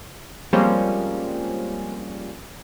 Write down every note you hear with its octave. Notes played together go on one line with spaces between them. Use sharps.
F3 G3 G#3 A#3 C4 C#4